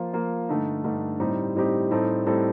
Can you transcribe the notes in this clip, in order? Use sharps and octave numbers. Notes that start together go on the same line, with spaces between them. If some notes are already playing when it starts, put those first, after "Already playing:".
Already playing: F3 A#3 F4
F3 A#3 F4
G2 D3 A3 D#4
G2 D3 A3 D#4
A2 G3 C4 D#4 G4
A2 G3 C4 D#4 G4
A2 G3 C4 D#4 A4
A2 G3 C4 D#4 A4